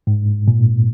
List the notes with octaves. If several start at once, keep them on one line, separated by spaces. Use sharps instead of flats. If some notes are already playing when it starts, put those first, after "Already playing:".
G#2
A#2